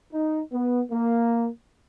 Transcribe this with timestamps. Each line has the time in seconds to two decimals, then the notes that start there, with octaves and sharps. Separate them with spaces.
0.12 D#4
0.53 B3
0.92 A#3